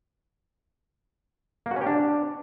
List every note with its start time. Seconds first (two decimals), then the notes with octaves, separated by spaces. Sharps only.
1.66 A#3
1.71 F#4
1.76 C#4
1.81 G4
1.87 D4